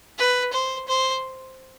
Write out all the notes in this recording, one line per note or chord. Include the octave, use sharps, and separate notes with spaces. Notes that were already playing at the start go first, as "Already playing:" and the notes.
B4
C5
C5